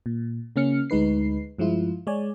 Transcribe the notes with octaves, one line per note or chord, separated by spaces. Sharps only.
A#2
C#3 A#3 C#4 F6 C#7
D2 G#3 D#4 B4 C7
G2 F3 G#3 E4 F4
G#3 C#5 D5 G#5